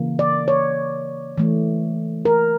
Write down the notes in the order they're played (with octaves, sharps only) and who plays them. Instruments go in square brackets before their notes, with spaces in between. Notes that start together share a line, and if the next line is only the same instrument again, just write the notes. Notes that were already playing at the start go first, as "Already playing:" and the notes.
Already playing: [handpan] C#3 E3 A#3
D5
C#5
E3 A3
A#4